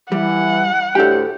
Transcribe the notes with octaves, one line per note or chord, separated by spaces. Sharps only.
E3 G3 F#5
D2 A2 G4 A4 G5